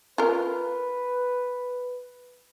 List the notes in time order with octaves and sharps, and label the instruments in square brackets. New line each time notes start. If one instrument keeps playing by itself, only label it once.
[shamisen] F4 A#4 [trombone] B4